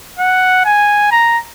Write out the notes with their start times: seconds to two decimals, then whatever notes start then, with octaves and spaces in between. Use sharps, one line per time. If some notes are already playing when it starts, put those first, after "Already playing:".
0.18 F#5
0.65 G#5
1.11 A#5